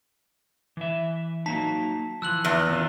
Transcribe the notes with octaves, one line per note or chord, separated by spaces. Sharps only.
E3 E5
F#3 A#3 D#4 A5 B6
E3 F3 E6 F#6 F#7
E2
D#3 C#4 F4